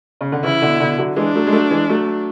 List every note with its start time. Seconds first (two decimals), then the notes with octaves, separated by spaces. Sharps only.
0.21 C#3
0.32 D3
0.43 C#3 E3 E4
0.62 B2 D3
0.80 B2 D3
0.98 D3 F#3
1.16 E3 G#3 D4
1.36 F#3 A3
1.47 G#3
1.52 F#3 A3
1.71 E3 G#3
1.89 F#3 A3